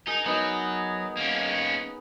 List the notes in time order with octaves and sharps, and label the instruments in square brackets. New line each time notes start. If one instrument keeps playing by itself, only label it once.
[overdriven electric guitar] D#4 [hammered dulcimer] G#4 A#4
[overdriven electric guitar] F#3 [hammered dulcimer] B3 D#4 A#4
[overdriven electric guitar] A#3 C#4